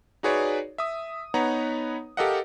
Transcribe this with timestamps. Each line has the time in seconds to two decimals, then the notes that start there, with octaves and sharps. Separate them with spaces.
0.23 D#4 F#4 G#4 B4 C#5 D5
0.78 E5 D#6
1.34 B3 D#4 B4 C#5 F#5 A#5
2.17 G4 A4 A#4 D#5 F5 F#5